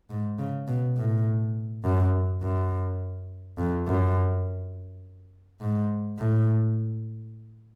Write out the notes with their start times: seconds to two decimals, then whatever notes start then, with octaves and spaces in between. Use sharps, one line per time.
0.10 G#2
0.38 C#3
0.68 B2
0.97 A2
1.84 F#2
2.42 F#2
3.57 F2
3.87 F#2
5.61 G#2
6.18 A2